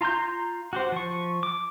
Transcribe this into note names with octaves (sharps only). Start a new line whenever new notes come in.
F4 A#5 C6 G6
F#4 G4 C5
F3 C#6
D6